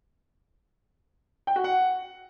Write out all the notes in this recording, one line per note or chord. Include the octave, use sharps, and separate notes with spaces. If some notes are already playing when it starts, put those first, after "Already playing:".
G5
F#4
F#5